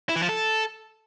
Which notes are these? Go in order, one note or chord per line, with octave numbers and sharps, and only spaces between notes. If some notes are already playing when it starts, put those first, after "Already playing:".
E4
E3
F3
A4